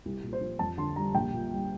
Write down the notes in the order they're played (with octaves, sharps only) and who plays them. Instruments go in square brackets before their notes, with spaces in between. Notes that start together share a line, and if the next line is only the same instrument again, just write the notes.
[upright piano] C2
A#2
C5
F3
F2 A5
D3 C6
G3 A#5
A#1 G5
A#2
G3